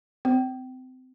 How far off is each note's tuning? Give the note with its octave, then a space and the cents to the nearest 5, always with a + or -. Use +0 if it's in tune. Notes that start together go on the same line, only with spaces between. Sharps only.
C4 -30